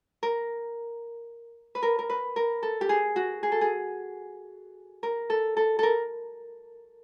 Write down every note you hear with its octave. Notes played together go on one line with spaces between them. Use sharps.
A#4
B4
A#4
A#4
B4
A#4
A4
G4
G#4
F#4
G#4
A4
G#4
A#4
A4
A4
A4 A#4